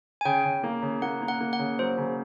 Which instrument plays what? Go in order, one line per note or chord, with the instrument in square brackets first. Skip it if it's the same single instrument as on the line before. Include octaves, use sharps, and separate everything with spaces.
[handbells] G#5
[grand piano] C#3 [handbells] G5
[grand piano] C#3
A#3
C#3
[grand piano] A#3 [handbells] F#5
[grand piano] A#3
[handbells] F#5
[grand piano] A#3
[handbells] F#5
[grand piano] C#3
[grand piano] F#3 [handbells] C5
[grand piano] C#3